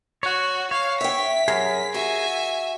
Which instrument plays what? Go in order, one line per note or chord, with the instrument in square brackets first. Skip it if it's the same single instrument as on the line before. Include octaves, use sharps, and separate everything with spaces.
[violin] F#4 [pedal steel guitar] C#5 F#5
[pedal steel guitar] C#5 [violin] F5
[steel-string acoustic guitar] E5 G5 [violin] B6
[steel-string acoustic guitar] F#2 [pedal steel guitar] G#4 A#4
[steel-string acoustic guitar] F#4 [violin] E5 G#5